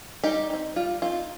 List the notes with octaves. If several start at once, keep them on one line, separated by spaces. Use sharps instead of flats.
G3 D#4 G4
C4 D#4
G3 F4
C4 D#4 F4